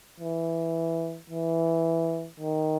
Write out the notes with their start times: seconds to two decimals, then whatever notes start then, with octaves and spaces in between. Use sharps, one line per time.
0.20 E3
1.30 E3
2.40 D#3